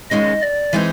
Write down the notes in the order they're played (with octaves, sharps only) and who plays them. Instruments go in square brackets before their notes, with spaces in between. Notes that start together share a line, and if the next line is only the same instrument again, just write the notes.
[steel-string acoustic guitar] D#2 D#3 G#3 C#4 [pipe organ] D#5
[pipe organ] D5
[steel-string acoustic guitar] E3 G#3 C4 D#4